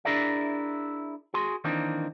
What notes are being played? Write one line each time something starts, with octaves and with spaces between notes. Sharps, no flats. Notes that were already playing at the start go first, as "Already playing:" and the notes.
D4 E4 G#4 A#4 D5 E5
F#4 G#4 C6
D#3 E3 A#3 C4 D4 D#4